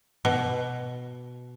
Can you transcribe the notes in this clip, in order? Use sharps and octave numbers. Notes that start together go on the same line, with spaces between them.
B2